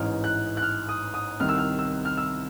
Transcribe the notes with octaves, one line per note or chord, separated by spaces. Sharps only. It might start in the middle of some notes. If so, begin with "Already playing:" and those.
Already playing: A1 G#2 E3 F6
F#6
F#6
F6
D#6
D#6
C2 C3 D#3 F6
E6
F6
E6
F6
E6